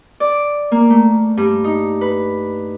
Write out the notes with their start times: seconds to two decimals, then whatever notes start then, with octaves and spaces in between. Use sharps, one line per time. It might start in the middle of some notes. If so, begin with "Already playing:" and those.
0.20 D5
0.72 A#3
0.90 A3
1.37 G2
1.64 D#4
2.01 B4